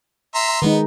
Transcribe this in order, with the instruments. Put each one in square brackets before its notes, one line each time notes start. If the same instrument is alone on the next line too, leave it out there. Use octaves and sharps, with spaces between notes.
[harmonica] E5 A#5 C6
[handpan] D#3 G#3 D#4 [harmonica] B3